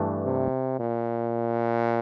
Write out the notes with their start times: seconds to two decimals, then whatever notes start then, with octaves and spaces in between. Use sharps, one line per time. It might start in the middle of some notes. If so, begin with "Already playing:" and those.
Already playing: G2 E3 A3 D4
0.26 C3
0.79 A#2